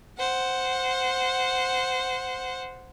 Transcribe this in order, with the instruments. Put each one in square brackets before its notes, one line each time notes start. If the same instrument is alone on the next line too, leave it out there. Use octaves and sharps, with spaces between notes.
[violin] C5 F#5